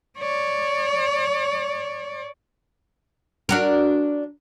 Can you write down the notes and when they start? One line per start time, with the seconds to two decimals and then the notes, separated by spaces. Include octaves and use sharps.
0.18 C#5 D5
3.49 D4 F#4 A#4